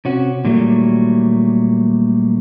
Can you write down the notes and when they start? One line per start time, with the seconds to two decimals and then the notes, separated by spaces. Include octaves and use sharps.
0.05 C3 C#4 F#4
0.45 A#2 D#3 F#3 G3 A3